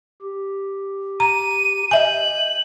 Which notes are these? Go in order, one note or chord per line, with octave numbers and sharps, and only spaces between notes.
G4
A#5 D#7
D#5 E5 G#5 G6 F#7